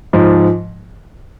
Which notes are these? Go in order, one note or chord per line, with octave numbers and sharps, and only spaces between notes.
G#2 F3